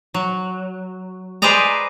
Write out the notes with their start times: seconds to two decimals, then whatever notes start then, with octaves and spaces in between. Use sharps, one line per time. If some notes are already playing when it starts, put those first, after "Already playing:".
0.14 F#3
1.42 G#4 B4 C5 D5 D#5 A#5